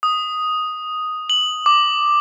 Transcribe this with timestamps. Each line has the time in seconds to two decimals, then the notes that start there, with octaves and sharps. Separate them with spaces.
0.03 D#6
1.30 F#7
1.66 D6